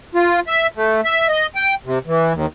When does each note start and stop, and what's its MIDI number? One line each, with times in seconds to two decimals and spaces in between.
0.15 0.40 65
0.47 0.67 76
0.76 1.01 57
1.05 1.28 76
1.28 1.47 75
1.55 1.75 79
1.85 1.99 48
2.07 2.33 52
2.33 2.46 39